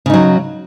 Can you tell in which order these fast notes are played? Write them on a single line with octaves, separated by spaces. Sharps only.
C#3 D#4 F#3